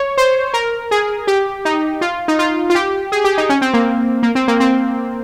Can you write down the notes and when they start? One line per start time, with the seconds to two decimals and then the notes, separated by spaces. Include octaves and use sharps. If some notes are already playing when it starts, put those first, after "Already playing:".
Already playing: C#5
0.18 C5
0.54 A#4
0.91 G#4
1.27 G4
1.65 D#4
2.01 F4
2.28 D#4
2.39 F4
2.70 F4
2.75 G4
3.12 G#4
3.24 G4
3.38 D#4
3.49 C#4
3.62 C4
3.74 A#3
4.23 A#3
4.35 C4
4.48 A#3
4.60 C4